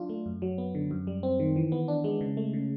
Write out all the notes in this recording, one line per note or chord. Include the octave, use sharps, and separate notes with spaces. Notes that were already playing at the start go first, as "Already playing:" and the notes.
Already playing: F#3 D4 F4
A3
F#2
F#3
B3
D3
F#2
G3
C4
D#3
E3
B3
D4
G#3
C#3
A3
C#3